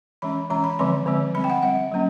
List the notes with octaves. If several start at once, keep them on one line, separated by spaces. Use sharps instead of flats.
E3 G#3 C#4 B5
E3 G#3 C#4 A#5
B5
D3 F3 G#3 C4 C6
D3 F3 G#3 C4
G3 C4 B5
G5
F#5
G3 C4 F#5
F#3 A#3 C#4